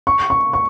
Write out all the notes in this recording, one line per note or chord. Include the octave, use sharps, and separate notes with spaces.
C#6
C#6
C#6